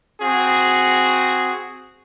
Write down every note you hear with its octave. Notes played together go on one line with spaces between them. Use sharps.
C4 F#4 G#4